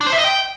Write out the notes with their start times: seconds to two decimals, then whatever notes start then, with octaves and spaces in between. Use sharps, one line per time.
0.01 D4
0.07 C5
0.12 E5
0.18 D#5
0.24 G5